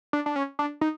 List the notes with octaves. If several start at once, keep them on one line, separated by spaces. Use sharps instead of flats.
D4
D4
C#4
D4
D#4